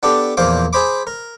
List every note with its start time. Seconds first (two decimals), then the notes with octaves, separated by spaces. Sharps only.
0.03 B3 D4 G4 A4
0.37 E2 A#2 F3 C5 C6 D6
0.73 G#4 C5 B5 D6
1.07 A#4